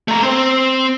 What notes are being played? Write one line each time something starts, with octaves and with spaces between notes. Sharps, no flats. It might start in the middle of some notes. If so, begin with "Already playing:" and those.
A3 A#5
C4 C5